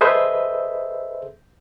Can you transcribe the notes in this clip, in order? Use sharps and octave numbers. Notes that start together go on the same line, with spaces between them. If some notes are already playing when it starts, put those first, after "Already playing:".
G#4 A4 B4 C5 D#5 E5